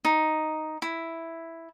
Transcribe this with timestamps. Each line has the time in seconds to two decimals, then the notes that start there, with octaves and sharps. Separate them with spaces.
0.05 D#4
0.82 E4